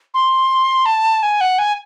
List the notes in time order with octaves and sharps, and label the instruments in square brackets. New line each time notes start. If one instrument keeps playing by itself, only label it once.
[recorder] C6
A5
G#5
F#5
G#5